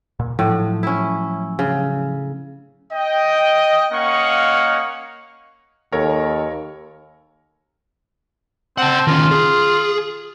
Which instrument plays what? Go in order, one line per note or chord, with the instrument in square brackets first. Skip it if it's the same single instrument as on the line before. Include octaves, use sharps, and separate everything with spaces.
[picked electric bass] A#2
[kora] A2 [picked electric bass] F3 F#3
[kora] C#4 E4
C#3
[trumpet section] D#5 G5
A#3 C#4 D#5 F5 F#5 C#6
[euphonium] D#2 [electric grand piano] A4 A#4 C#5
[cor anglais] C4 [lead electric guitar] F#5 A5
[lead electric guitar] D#3 C#4 [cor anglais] F4
[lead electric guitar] G#4